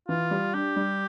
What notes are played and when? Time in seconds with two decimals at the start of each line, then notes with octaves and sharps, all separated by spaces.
0.08 E3 F4
0.31 G3
0.54 D4 G4
0.76 G3